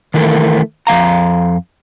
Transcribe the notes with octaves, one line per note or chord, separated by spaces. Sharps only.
D#3 E3 A3 A#4
F2 G3 F5 A#5